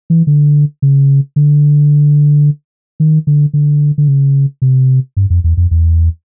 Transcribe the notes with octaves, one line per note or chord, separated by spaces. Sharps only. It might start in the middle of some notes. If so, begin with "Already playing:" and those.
E3
D3
C#3
D3
D#3
D3
D3
D3
C#3
C3
G2
F2
E2
F2
E2